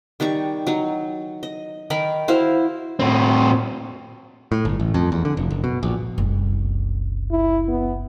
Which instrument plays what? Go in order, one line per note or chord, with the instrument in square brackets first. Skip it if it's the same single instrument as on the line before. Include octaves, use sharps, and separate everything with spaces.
[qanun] D#3 G3 D#4 C#6
F#3 D#4
D#5
D#3 D#4 A#4 B5
E4 F#4 C5 F5
[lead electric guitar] A2 C4
[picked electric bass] A2
G1
A1
F2
E2
D3
F1
F#1
B2
A#1
[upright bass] F#1 C2
[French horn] E4
B3